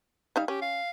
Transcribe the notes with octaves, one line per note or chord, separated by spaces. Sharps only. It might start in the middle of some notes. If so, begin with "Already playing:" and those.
G3 D#4 F5
C#4 G4
F5